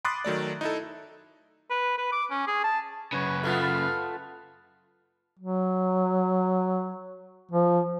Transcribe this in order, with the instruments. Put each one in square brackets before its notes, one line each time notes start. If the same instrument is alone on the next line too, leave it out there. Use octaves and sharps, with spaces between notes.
[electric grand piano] B5 C6 D6 D#6 F#6 A6
D#3 F#3 A3 D5
D#4 E4 A4
[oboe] B4
B4
D6
C#4
G#4
A5
[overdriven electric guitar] F#2 C#3 [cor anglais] B4 [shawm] C#5
[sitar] A3 B3 F4 [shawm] F5
[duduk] F#3
F3